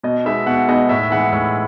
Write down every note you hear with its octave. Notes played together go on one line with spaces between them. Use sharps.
B2 D#5
G#3 B3 D#4 E5
B2 F#5
G#3 B3 D#4 D#5
A2 E5
E3 G#3 D#4 F#5
A2